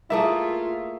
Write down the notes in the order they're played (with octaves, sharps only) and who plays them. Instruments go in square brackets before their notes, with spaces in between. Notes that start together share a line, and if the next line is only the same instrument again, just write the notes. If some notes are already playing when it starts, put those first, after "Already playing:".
[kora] A3 A#3 E4 [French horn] F4 [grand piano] G#4 E5